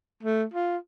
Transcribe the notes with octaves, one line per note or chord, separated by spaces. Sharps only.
A3
F4